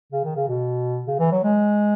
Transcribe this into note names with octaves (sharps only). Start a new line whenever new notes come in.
C#3
D#3
C#3
B2
C#3
E3
F#3
G#3